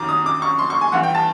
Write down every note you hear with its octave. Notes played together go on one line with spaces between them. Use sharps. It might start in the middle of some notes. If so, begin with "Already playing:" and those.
Already playing: F#2 D#3 A#5 D6
D#6
D6
C#6
C6
C#6
G#5
G2 E3 F#5
G5
A5